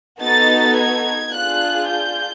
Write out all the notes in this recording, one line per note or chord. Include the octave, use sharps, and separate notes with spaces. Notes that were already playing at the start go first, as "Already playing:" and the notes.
B3 D#4 F#4 A4 A6
G#6
D4 F4 G#4 F#6
G6